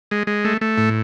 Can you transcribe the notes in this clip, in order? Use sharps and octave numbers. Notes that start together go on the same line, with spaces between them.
G#3
G#3
A3
A3
A2